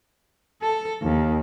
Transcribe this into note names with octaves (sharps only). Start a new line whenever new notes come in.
A4
D#2